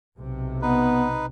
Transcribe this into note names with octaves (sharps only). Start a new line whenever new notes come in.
B1 C3
B3 D#4 B4